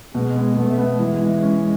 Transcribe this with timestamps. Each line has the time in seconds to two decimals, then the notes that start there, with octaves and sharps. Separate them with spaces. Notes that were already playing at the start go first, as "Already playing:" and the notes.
0.14 B2 G#3
0.36 B3
0.57 B2 A3
0.78 B3
0.99 E3 G#3
1.21 E3
1.42 C#4